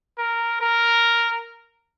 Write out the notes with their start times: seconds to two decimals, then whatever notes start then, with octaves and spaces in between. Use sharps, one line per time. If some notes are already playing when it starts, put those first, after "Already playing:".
0.18 A#4
0.61 A#4